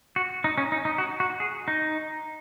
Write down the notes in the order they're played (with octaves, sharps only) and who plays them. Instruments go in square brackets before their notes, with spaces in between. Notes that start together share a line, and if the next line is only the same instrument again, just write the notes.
[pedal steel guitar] F#4
D#4
C#4
D#4
D#4
F#4
F#4
G#4
D#4